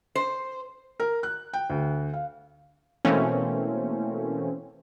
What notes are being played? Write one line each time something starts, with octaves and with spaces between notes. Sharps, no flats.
C5
A#4
F#6
G5
D2
F5
B2 E3 A3 A#3 C4 C#4